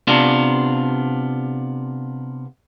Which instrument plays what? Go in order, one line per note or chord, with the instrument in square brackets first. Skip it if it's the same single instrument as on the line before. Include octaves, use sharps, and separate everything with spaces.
[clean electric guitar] C3 B3 D4 F4